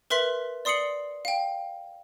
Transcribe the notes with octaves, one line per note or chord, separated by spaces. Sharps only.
A#4 B4 E5 C6 B6 F#7
D5 C6 D#6 C7 C#7 F#7
F5 G5